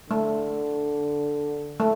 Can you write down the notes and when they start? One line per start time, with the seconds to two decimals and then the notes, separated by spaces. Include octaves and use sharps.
0.10 D3 A3
1.80 A3